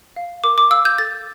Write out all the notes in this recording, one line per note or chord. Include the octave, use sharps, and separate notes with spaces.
F5
A#4 D6
D6
F5 E6
G6
A4 A6